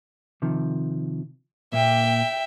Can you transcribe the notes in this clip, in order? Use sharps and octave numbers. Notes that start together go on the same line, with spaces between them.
C3 D#3 F3
A#2 A#3 E5 G5